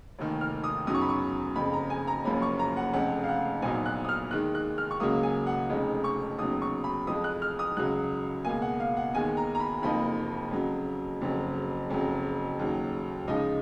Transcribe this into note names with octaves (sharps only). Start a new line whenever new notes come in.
F1 D#2 D#3
F6
D#6
F#2 C#3 F#3 B3 D#4 D#6
C#6
B5
C#6
F#1 F2 C#3 B5
A#5
G#5
A#5
F#1 F#2 F3 A#3 C#4 B5
C#6
A#5
F#5
F1 F2 C#3 F#5
F5
F#5
A#1 A#2 F#3 B3 D#4 G#5
F#6
D#6
F6
D#2 D#3 G#3 F#6
F#6
F6
C#6
C#2 C#3 F#3 A#3 D#6
G#5
F#5
F1 F2 C#3 G#3 D#4
C#6
D#2 C#3 F#3 B3 D#6
C#6
B5
F2 F3 G#3 D#6
F#6
F6
D#6
C#2 C#3 F#3 F#6
C#2 B2 A#3 G#5
F#5
F5
F#5
D#2 D#3 G#3 B3 G#5
A#5
A#5
B5
F#1 F2 F3 A#3 D#4 B5
F2 C#3 F#3
F#1 F2 C#3 F#3
F#1 F2 C#3 F#3
D#2 C#3 F#3
C#2 C#3 F3 G#3 D#4 D#5